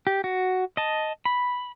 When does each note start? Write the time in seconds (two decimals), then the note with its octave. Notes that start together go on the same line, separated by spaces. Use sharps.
0.07 G4
0.24 F#4
0.77 D#5 A5
1.25 B5